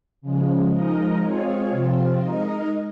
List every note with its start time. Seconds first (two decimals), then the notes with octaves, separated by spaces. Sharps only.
0.21 C#3 F3 G#3
0.72 F3 G#3 D#4 A#4 D#5
1.21 G#3 C4 F4 G#4 C#5
1.70 C3 F3 C4 F4
2.19 G#3 D#4 A#4 D#5